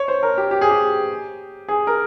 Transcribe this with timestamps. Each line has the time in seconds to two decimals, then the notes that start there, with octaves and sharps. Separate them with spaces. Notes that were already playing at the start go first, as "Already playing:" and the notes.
Already playing: C#5
0.08 C5
0.23 A#4
0.38 G4
0.51 G4
0.61 G#4
0.70 G4
1.68 G#4
1.87 A#4